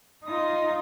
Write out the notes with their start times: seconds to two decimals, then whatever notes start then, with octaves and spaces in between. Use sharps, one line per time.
0.24 D#4 F4 D#6